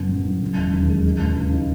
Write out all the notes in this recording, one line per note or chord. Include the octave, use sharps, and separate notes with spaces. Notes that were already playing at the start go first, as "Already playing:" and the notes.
Already playing: F#1 C#3 B3
F#2
F#1
C#3
E1
D#2
G#3
G#3
C#2
C#3
D#4